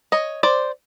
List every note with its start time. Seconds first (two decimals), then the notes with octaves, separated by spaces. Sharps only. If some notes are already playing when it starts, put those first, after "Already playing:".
0.12 C#5 D#5
0.43 C5 D5